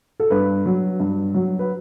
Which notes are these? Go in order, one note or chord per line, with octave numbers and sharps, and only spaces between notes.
A4
G2 B4
F#3
G2
F#3
B4